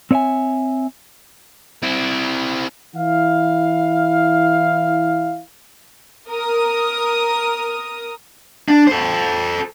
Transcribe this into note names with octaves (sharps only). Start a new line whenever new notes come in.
C4 C#5 D5 E5 G#5
C4 E4
E3 E4 F5
A#4 D#6
D4
A4 C5